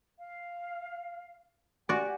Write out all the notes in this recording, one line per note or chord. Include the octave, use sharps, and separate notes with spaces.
F5
F#4 G4 D5 F#5 G#5